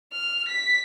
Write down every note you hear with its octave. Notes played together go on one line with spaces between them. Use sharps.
F6
B6